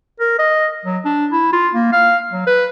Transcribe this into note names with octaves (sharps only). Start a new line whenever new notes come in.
A#4
D#5
F#3
D4
E4
F4
A#3
F5
F#3
B4